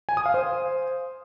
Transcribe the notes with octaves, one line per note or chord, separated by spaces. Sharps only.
G#5
D#6
F5
C5